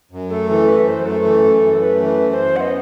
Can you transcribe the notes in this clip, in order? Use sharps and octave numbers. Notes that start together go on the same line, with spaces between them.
F#2
A3 A4
E3 A4
F#2 B4
F#2 C5
A3 A4
E3
F#2
F#2
A3 B4
E3
B4
F#2
C5
F#2
B3 D#5 F#5